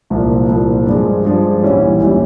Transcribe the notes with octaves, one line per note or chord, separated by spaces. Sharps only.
C2 A#2 F3
C2 A#2 F3
G2 F3 G#3
G2 F3 G#3
A#1 G#2 E3 G3 C#4
A#1 E3 G3 C#4